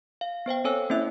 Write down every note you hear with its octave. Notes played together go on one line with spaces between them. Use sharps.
F5
B3 C5 F5 G5
C4 A4 C5 C#5 G#5 E6
A#3 C4 C#4 E4 E5 E6